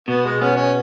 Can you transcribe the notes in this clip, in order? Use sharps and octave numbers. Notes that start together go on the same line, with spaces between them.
B2 B3
G#3
B3 C#4
C#4